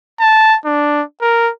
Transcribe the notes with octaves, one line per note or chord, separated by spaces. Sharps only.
A5
D4
A#4